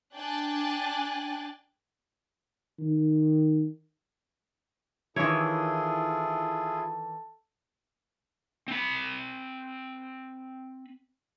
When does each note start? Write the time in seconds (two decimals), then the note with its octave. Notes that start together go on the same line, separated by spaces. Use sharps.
0.14 D4 G5 G#5 F#6 A6
2.79 D#3
5.16 D#3 E3 E4 F4 G#4 A4 C#5
8.68 C4 B5